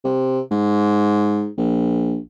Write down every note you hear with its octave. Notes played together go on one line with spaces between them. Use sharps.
C3
G#2
A#1